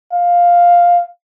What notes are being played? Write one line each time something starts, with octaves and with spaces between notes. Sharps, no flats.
F5